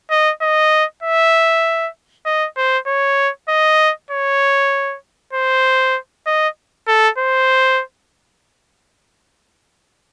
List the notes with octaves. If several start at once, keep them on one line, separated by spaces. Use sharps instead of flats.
D#5
D#5
E5
D#5
C5
C#5
D#5
C#5
C5
D#5
A4
C5